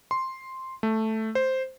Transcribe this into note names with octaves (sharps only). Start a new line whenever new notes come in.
C6
A3
C5